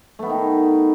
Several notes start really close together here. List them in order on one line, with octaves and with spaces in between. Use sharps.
A3 B3 D#4 D#3